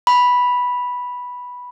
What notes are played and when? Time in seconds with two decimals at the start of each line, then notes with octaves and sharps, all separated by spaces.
0.07 B5